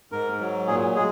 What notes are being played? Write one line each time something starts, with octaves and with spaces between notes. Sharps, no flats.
G#2 A#4
F#3
A#2 G#4
G#3 G#4